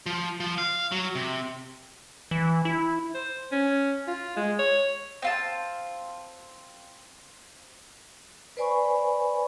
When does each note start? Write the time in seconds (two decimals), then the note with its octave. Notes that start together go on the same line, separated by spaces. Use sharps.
0.06 F3
0.40 F3
0.58 F5
0.92 F#3
1.15 C3
2.31 E3
2.65 E4
3.15 C5
3.52 C#4
4.08 F4
4.36 G#3
4.59 C#5
5.22 C4 F4 A5
8.57 B4 C5 D5 G#5 B5 C#6